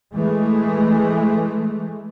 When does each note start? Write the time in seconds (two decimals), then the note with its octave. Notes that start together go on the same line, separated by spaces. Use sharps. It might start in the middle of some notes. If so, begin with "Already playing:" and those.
0.14 E3 G#3 A3